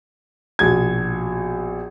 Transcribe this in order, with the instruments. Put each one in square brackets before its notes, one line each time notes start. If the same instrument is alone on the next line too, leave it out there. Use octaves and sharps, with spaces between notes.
[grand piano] A#1 B2 G#6